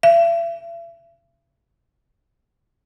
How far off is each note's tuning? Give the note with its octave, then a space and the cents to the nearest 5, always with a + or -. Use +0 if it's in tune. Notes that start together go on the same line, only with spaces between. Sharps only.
E5 +40